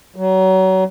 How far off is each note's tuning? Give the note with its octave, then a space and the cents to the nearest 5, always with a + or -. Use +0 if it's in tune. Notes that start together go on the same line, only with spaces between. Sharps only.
F#3 +30